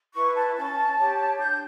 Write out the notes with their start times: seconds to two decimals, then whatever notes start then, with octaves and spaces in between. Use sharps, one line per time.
0.13 E4 B4 C#6
0.34 A5
0.55 C#4 A5
0.97 G4 C#5
1.39 D4 G6